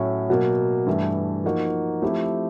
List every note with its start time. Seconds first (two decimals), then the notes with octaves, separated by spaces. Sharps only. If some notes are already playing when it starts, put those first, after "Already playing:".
Already playing: A2 F#3 A3 C#4
0.30 B2 F#3 A#3
0.86 G2 E3 A3
1.44 F3 A#3 D#4 F#4
2.02 F3 A3 C4 E4 G4